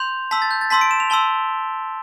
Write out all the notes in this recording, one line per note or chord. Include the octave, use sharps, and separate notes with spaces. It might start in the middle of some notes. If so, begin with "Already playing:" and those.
Already playing: C6 G6 F7
A5 C6 E6 B6
A6
G6
A6
A5 C6 E6 B6
D7
E7
F7
A5 C6 E6 G7